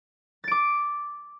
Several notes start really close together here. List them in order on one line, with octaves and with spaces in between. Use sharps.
A6 D7 D6